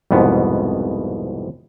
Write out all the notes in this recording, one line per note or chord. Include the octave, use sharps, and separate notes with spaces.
C2 F2 G#2 B2 B3